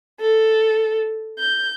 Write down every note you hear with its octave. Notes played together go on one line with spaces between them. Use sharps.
A4
G6